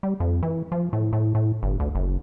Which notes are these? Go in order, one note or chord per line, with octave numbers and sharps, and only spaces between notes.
G3
F2
E3
F3
A2
A2
A2
G1
D2
F#1